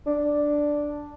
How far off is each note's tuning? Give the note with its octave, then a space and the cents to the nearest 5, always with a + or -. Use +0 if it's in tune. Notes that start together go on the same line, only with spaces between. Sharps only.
D4 +0